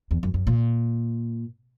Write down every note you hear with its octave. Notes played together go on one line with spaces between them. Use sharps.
E2
F#2
F#2
A#2